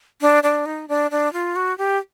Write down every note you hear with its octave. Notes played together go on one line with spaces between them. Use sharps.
D4
D4
D#4
D4
D4
F4
F#4
G4